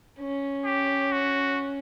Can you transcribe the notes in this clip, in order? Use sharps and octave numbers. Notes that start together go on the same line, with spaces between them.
C#4
G4
F#4